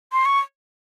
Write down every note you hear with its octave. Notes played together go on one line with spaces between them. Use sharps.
C6
C#6